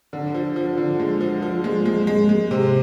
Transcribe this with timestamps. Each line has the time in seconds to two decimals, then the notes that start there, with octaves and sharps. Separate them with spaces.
0.13 D3
0.34 F3
0.56 F3
0.77 D3
0.99 G#3
1.21 F3
1.42 F3
1.64 G#3
1.85 G#3
2.07 G#3
2.29 G#3
2.51 C3